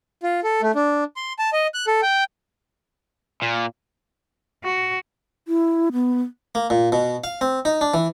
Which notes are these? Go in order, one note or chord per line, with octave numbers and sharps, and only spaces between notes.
F4
A4
A3
D4
C6
A5
D#5
F#6
A4
G5
A#2
F#4
E4
B3
A#3
A#2
B2
F5
C4
D#4
D4
E3